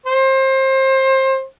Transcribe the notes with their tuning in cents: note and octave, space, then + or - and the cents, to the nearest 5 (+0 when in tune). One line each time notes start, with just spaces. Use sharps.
C5 +25